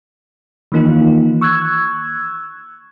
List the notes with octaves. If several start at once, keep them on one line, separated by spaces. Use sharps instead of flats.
D#3 E3 A#3 D#4 F4
C#6 E6 F#6 G#6